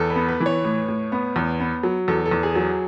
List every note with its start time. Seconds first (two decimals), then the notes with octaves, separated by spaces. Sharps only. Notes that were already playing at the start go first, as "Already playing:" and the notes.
Already playing: E2 A4
0.10 B4
0.16 B3
0.29 B4
0.40 E3
0.46 C#5
0.64 A2
0.88 A2
1.12 B3
1.36 E2
1.60 B3
1.83 F#3
2.08 E2 A4
2.26 A4
2.31 E2
2.43 G#4
2.55 F#3